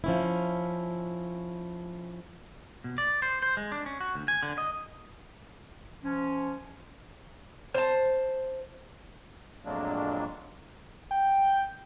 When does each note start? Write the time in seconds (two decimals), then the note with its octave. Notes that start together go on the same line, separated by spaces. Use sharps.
0.04 F3 C#4 E4
2.84 B2
2.98 D5
3.22 C5
3.42 C5
3.57 G#3
3.72 D4
3.86 C#4
4.01 F#4
4.15 D2
4.28 G#5
4.43 D3
4.58 D#5
6.03 F3 C#4
7.74 C5 A5
9.65 F2 A2 F#3 G#3 A#3 D4
11.11 G5